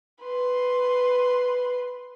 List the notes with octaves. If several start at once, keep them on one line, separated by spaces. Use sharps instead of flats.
B4 C6